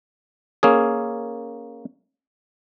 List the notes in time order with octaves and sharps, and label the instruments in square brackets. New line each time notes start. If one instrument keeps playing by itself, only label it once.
[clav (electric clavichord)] A#3 C#4 G#4